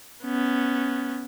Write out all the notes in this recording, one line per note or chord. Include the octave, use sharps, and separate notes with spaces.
B3 C#4